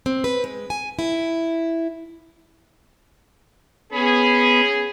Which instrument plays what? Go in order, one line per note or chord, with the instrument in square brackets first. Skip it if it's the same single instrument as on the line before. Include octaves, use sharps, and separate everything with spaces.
[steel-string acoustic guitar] C4
B4
G#3
G#5
E4
[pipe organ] B3 B5 [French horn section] C#4 G#4